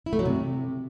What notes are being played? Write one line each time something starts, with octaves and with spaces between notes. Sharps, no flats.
E4
A3
F#3
C3